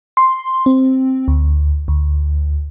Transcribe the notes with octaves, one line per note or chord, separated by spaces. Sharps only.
C6
C4
D2
D2